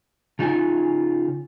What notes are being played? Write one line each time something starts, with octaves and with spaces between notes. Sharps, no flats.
C#3 D#4 F4 D5 G#5